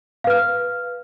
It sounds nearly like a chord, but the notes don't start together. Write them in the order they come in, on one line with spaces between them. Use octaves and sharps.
F5 B4 F6